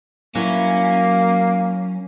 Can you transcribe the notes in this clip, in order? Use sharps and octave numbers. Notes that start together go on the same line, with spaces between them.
F#3 A#3 C#4 E4 B4